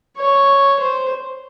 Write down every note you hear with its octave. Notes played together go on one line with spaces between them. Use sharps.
C#5
C5